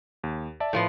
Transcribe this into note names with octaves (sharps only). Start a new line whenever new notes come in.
D#2
D5 E5 A5
A2 F3 B3